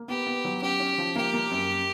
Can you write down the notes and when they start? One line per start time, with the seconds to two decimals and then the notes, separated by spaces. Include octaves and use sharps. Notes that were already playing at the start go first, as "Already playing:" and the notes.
Already playing: A#3
0.08 B3 G4
0.27 B3
0.45 F#3
0.62 C#4 G4
0.80 C#4
0.98 F3
1.16 A#3 G4
1.34 A#3
1.51 F#2